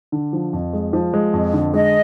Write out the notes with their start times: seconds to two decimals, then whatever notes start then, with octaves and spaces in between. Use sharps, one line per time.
0.12 D3
0.33 F3
0.53 F2
0.73 G#3
0.93 F3
1.14 G#3
1.34 F2
1.53 D3
1.74 G#3 D#5